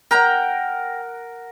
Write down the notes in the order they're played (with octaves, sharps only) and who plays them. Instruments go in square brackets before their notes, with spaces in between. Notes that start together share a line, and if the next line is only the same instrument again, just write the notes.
[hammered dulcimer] A#4 F#5 [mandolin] G5 A#5